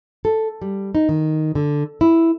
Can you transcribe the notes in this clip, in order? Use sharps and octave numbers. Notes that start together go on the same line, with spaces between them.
A4
G3
D#4
D#3
D3
E4